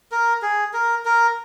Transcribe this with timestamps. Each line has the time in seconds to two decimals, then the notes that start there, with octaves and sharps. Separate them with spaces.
0.12 A#4
0.42 G#4
0.73 A#4
1.05 A#4